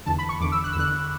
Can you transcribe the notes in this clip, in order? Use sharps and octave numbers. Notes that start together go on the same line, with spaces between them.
E2 D3 A5
B5
C#6
E2 D3 D6
E6
F#6
E6
E2 D3 F#6